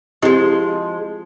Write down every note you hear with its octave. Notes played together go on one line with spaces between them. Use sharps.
F3 G#3 C4 E4 G4